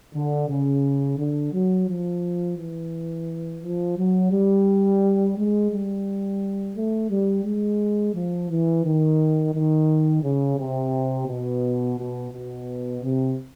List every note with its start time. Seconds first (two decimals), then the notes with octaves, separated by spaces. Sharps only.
0.13 D3
0.48 C#3
1.18 D3
1.52 F#3
1.88 F3
2.57 E3
3.62 F3
3.97 F#3
4.31 G3
5.36 G#3
5.71 G3
6.75 A3
7.10 G3
7.44 G#3
8.14 F3
8.50 E3
8.84 D#3
9.54 D#3
10.23 C#3
10.58 C3
11.28 B2
11.97 B2
12.32 B2
13.02 C3